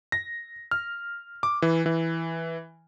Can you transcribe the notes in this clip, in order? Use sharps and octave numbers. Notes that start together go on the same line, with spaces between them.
A#6
F6
D6
E3
E3